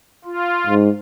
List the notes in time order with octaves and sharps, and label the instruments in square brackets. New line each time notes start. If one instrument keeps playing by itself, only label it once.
[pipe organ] F4
[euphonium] G#2